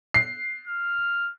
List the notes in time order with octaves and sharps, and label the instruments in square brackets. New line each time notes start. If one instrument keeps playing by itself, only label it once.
[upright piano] C7
[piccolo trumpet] F6